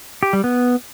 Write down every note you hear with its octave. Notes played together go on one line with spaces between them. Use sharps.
G4
G3
B3